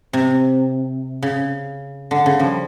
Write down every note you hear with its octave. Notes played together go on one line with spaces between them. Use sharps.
C3
C#3
D3
C#3
F3 G3